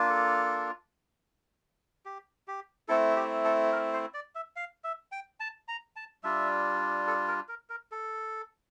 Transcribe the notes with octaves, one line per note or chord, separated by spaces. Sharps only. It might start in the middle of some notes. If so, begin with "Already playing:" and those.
Already playing: A#3 D4 F4
A4
G4
G4
A3 C4 E4 A4
G4
A4
A#4
C5
D5
E5
F5
E5
G5
A5
A#5
A5
G3 D4 F4 E5
A4
A#4
A#4
A#4
A4